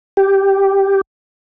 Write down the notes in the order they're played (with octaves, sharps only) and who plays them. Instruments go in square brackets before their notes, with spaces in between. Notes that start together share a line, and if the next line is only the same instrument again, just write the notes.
[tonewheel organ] G4